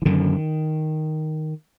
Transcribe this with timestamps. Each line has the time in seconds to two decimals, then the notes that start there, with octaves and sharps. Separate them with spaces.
0.02 E3
0.05 F#2 D3 D#3